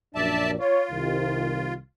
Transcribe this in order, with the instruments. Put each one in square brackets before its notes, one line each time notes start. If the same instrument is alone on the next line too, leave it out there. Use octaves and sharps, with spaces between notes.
[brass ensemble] A#1 F#2 D4 [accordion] D5 E5 A5
[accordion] F4 [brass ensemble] C#5
[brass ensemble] C2 C3 D#3